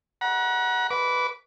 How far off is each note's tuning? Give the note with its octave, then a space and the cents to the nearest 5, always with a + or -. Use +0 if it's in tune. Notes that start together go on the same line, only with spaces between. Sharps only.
F#5 +0 A#5 +45
B4 +0 D6 -25